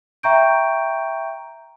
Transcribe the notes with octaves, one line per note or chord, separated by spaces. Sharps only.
E5 G5 A#5 C#6 G6 D7